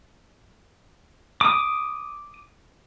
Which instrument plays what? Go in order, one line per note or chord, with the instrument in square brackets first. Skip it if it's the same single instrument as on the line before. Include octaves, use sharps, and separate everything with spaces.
[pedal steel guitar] D6 D#6